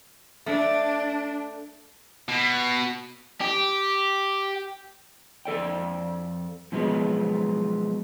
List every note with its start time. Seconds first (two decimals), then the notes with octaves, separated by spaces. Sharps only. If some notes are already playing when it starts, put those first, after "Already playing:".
0.46 A3 D4
2.28 B2
3.41 G4
5.45 F2 A4 D5 G5
6.72 B2 F3 F#3 G#3 B3